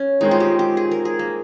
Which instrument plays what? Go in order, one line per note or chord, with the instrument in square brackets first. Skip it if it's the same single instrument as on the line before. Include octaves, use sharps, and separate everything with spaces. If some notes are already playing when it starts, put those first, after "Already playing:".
Already playing: [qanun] C#4
[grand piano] D#3 G#3 C4 [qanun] D#4
[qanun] F4
G4
G4
G#4
A#4
G#4
A#3